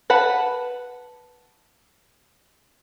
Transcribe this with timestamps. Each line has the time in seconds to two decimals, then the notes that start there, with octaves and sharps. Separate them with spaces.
0.10 B4 F#5 A5 B5